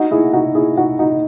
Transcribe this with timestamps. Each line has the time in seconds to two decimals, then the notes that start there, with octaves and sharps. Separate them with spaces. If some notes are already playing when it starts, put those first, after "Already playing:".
Already playing: D#4 F#4
0.11 E4 G#4
0.33 D#4 F#4
0.55 E4 G#4
0.77 D#4 F#4
0.99 D#4 F#4